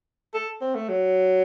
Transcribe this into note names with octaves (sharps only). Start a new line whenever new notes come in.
A4
C4
A3
F#3